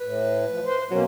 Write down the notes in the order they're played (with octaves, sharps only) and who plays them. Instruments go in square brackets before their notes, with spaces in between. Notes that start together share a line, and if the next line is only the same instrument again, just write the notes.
[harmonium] A2 [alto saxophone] B4
[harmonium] F3
C5
[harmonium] B2 A#3 C#4 [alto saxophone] F#3